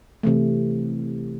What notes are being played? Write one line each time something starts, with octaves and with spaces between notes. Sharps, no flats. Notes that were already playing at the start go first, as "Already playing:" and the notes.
C3 E3 A3